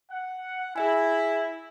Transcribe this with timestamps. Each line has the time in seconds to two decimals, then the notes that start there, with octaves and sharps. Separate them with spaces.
0.11 F#5
0.76 E4 G#4 E5 G#5